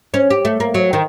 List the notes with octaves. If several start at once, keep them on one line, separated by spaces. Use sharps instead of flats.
C#4
G4
A3
A#3
F#3
D#3